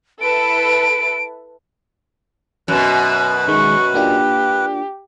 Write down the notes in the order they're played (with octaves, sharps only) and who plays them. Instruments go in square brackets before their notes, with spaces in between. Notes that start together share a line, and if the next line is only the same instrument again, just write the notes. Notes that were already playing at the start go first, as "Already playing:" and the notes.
[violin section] E4 A4 B4 [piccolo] D7
[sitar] F#2 B2 [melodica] B4
[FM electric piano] D#3 G#3 [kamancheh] C#6
[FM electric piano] A#3 D4 F4 [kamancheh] G4